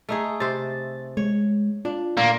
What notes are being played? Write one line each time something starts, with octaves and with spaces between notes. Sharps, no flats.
A3 D#4 G#4
C3 C5 A6
G#3 C#5
D4 F4
A#2 A#3